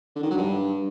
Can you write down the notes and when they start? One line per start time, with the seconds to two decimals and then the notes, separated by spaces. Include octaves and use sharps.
0.16 D3
0.23 D#3
0.30 F#3
0.38 G2